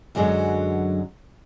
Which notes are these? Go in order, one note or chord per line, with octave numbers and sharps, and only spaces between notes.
F#2 D3 F#3 G#3